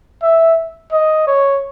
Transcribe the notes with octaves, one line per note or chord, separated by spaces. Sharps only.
E5
D#5
C#5